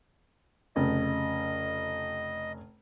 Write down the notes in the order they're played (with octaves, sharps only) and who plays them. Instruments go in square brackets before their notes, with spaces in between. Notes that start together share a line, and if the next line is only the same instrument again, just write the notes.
[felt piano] F1 C#3 [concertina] D#5